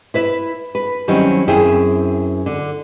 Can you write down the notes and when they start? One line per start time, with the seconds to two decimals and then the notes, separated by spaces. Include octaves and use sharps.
0.14 E4 B4 E5
0.75 B4
1.08 D#3 F#3 G3 C4 C#4 E4
1.48 F#2 C4 E4 G#4 E5 G5
2.46 D3